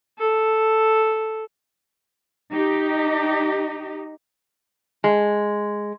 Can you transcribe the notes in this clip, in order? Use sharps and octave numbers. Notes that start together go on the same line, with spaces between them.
A4
D#4 G4
G#3